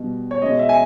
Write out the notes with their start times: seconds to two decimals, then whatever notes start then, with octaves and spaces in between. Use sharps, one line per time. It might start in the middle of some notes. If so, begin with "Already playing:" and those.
Already playing: B2 G3
0.31 C#5
0.42 B2 G#3 D#5
0.59 E5
0.69 G#5